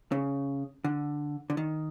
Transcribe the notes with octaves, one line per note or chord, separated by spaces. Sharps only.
C#3
D3
D3
D#3